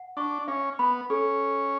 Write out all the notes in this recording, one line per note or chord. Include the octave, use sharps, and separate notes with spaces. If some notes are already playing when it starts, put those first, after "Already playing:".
Already playing: F#5
D4 C#6
C#4 E5
B3 B5
C#4 A4